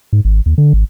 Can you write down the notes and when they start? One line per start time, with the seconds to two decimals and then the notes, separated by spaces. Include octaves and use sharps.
0.13 G#2
0.25 G#1
0.46 D#2
0.58 D3
0.73 G#1